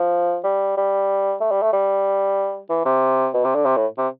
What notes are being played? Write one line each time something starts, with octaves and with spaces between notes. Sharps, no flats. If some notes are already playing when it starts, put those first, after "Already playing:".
Already playing: F3
G3
G3
A3
G3
A3
G3
E3
C3
B2
C3
D3
C3
A2
C3